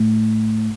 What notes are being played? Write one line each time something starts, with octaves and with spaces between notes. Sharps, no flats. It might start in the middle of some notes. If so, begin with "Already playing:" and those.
Already playing: A2